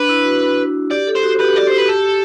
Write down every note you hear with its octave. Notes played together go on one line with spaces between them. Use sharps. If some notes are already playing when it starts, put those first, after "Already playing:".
Already playing: D4 B4
E4
F#4
G4 D5
A4
C5
F#4
G4 B4
D5
C5
B4
G4 A4